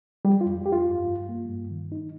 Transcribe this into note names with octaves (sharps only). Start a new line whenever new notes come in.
G3 G4
F4
F2
F2 G4
F4
G2
G2
A#3
G2
D#3
D#4